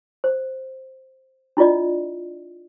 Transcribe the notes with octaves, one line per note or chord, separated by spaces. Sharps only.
C5
D4 E4 F4 D5 D#5